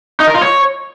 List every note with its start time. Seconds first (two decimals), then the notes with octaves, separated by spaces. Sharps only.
0.20 D#4
0.27 A#4
0.35 F4
0.42 C#5